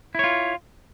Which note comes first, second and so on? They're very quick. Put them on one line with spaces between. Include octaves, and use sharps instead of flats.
E4 C#5 F4